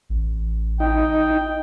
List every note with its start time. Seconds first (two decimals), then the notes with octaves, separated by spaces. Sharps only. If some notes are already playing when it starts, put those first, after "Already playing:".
0.10 A1
0.80 D#4 G5